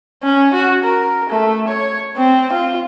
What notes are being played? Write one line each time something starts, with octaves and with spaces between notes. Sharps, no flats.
C#4
F#4
A#4
A3
C#5
C4
F4